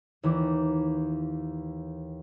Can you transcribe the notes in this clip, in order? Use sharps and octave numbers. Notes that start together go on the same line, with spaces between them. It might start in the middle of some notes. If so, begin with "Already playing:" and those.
D#2 E3